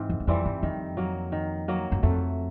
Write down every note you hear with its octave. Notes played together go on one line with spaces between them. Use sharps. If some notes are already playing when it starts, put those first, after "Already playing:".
Already playing: G#2 E3 C4
F2
E2
F2 E3 G3 C4
G2
F2 D#3
F#3 A#3
D#3
F#3 A#3
F#2
F2 A3